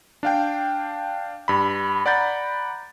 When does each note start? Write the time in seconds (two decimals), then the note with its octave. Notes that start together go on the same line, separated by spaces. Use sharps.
0.23 D4 F5 G5
1.48 G2 B5
2.06 D5 F#5 A#5 B5 G6 A6